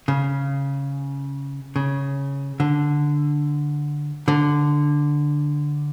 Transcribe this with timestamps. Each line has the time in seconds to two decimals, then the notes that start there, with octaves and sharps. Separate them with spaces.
0.08 C#3
1.76 C#3
2.60 D3
4.28 D3